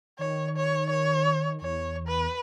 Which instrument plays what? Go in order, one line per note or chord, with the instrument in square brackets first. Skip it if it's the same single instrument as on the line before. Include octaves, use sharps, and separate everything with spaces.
[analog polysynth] D#3 [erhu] C#5
[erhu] C#5
C#5
[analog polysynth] E2 [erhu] C#5
[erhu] B4